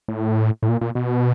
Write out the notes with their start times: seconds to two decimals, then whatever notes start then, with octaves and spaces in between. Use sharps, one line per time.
0.08 A2
0.63 A2
0.69 A#2
0.81 A#2
0.95 B2